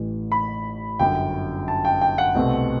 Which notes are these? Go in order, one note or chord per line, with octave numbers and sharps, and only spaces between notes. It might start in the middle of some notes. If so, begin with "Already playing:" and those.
Already playing: A1 A2 E3
B5
G1 F#2 F#3 G5
A5
G5
G5
F#5
C2 B2 A3 C4